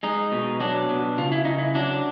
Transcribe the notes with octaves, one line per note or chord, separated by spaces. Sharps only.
G#3 D#4
B2
F#3 D4
B2
C#3 F4
E4
C#3 D#4
E4
F#3 D4